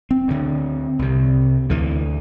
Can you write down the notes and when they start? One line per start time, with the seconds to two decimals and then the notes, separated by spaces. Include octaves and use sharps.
0.11 C4
0.28 D2 D3
0.99 C2 C3
1.70 D2 D3 E3